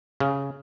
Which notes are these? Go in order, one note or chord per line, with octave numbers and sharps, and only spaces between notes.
C#3